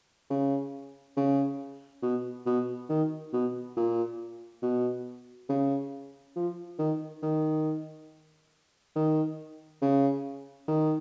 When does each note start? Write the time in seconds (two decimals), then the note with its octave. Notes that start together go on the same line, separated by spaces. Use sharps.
0.30 C#3
1.17 C#3
2.02 B2
2.46 B2
2.90 D#3
3.33 B2
3.77 A#2
4.62 B2
5.49 C#3
6.36 F3
6.79 D#3
7.23 D#3
8.96 D#3
9.82 C#3
10.68 D#3